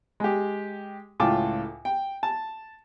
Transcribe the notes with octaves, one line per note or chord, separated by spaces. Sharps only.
G#3 G4
C#2 A2 F4 G5 A5 D6
G5
A5